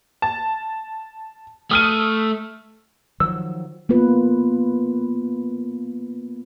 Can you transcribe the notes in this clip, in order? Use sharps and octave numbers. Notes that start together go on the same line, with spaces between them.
A5
A3 D#6 F6 D#7
D#3 F3 F#3 E6
A#3 B3 F4 B4